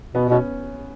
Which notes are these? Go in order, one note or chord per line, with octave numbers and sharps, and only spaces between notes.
B2 B3
B2 C#4